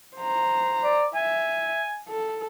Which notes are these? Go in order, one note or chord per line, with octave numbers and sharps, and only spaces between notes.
C5 A#5
D5
E5 G#5
A4